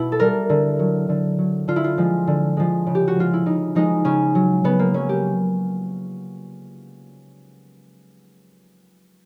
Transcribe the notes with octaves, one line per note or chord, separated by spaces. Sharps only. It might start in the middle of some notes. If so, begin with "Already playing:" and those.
Already playing: B2 E4
A4
G3 A#4
D3
F#3
D3
F#3
D3 F4
E4
F4
F3 G#3
D3
F3 G#3
C#3
G4
F#4
F3 G#3 F4
E4
C#3 D#4
F3 G#3 D#4
C#3 C#4
F#3
C#3 B3
A#3
F#3 C#4
G4